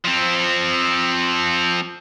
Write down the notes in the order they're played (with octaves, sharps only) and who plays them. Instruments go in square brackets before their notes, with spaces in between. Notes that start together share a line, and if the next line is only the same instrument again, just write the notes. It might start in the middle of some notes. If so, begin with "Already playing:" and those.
[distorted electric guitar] F3 C4